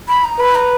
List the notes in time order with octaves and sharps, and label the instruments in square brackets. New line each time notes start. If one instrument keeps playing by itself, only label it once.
[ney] B5
A#5
[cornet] B4 [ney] B5
[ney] A#5